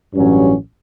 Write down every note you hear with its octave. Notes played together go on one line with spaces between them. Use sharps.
A1 G2 F#3 C#4